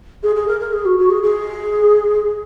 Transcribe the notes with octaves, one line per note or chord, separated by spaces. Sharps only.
G#4
G#4
A#4
A#4
G#4
F#4
F#4
G#4
G#4